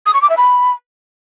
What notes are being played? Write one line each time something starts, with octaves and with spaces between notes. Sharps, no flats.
D#6
C#6
D6
E5
B5